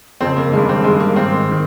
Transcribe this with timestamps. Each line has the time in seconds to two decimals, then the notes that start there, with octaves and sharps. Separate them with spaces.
0.21 F2 C#3 C4
0.37 A#3
0.52 D#3 G#3
0.57 G2
0.69 C4
0.84 G2 D#3 G#3
1.00 A#3
1.15 G#2 D#3 C4
1.51 D#3